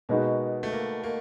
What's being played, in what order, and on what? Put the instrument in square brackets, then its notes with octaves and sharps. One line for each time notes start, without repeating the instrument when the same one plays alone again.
[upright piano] B2 G#3 B3 D#4 F#4 [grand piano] A#3
[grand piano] A3
A#3
A#3